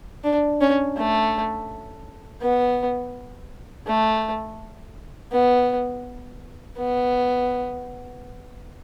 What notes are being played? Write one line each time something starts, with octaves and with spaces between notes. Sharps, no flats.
D4
C#4
A3
B3
A3
B3
B3